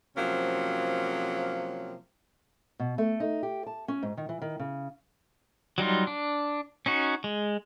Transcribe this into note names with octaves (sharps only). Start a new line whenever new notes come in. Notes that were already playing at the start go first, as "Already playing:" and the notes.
C3 F3 F#3 A#3 C#4
B2
A3
D#4
G4
A5
C#4
G#2
D#3
E3
D#3
C#3
F#3 G3 D#4 F4
D4
C#4 D#4 F#4
G#3